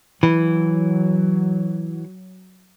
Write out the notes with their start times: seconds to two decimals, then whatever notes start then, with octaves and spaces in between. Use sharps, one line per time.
0.23 E3 F#3